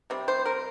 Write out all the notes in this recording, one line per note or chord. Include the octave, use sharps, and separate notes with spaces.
C3 G3 C4
C5
A#4